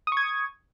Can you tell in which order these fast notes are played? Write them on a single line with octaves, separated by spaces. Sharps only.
D#6 C#6 G#6